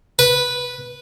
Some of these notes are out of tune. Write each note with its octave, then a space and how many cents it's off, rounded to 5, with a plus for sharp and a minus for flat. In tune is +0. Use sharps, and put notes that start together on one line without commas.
B4 -5